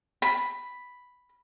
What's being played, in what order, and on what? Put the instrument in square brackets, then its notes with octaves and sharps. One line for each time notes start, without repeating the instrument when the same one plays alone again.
[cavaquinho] B5